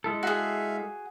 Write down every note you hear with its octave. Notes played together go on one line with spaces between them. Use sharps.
G#3 E4 A4
F#4 G#4 E5 F5